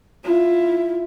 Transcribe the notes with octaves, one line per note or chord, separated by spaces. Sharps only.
E4 F4